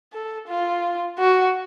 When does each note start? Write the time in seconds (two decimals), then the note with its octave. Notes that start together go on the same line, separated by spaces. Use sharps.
0.13 A4
0.48 F4
1.19 F#4